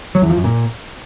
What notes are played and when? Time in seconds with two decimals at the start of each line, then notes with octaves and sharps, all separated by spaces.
0.15 F#3
0.22 E2
0.30 F3
0.37 F#2
0.44 A#2